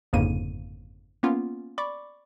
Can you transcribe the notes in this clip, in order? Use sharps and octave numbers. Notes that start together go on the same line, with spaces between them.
G1 F2 G#2 C#3 A#3 D#7
A#3 B3 C#4 F4
D5 B5 C#6 D6